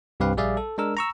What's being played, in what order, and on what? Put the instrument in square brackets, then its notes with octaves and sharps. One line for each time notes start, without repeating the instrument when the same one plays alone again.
[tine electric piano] C2 G2 C4 G4 B4 F5
A#1 G3 G#4 D5 E5 F5
A4
G#3 D4 A#4 E6
A#5 C#6 E6